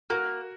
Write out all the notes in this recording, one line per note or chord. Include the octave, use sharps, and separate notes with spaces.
A#3 F#4 A#4